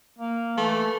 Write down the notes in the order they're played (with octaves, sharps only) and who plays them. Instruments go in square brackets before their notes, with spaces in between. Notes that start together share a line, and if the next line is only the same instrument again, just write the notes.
[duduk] A#3
[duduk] E3 [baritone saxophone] A3